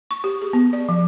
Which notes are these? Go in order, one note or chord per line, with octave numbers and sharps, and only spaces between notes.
C#6
G4
G#4
B3
D5
F3